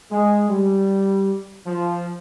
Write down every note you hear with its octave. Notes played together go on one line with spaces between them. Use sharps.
G#3
G3
F3